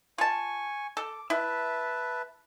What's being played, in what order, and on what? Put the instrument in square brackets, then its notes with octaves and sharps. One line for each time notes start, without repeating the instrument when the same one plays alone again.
[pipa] F4 A5 [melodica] G#5 C#6
[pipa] A4 [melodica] D6
[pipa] E4 [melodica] B4 E5 A5